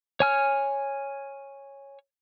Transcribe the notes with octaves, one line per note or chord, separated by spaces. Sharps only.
C#5 G#5 F6